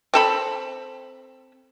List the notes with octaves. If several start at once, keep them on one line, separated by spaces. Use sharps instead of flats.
C4 A4 B5